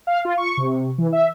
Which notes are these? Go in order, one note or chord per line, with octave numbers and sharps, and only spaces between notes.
F5
F4
C#6
C3
E3
E5